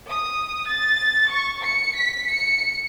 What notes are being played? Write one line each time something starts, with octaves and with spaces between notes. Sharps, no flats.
D#6
A6
C#6
C#7
B6
C#7